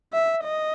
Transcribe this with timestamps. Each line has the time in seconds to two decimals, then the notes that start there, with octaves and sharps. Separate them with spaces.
0.13 E5
0.44 D#5